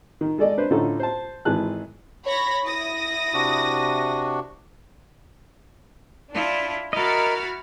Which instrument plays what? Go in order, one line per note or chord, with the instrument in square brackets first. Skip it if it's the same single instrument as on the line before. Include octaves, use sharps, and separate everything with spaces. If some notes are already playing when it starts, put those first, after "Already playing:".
[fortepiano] D#3
G#3 A4 D5 D#5
D4 B4 C5
A2 D3 C#4 D#4 F4 A4
C5 A5
G#1 E3 G#3 A5 F#6
[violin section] C#5 B5 A#6
E4 D#6 A#6
[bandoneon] C3 D4 F#4
[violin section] D4 [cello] E4 F4
[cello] E4 F#4 [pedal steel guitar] A#4 D#5 [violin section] B5 F6 A6